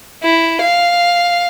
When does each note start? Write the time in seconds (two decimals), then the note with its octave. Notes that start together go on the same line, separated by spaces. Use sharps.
0.23 E4
0.62 F5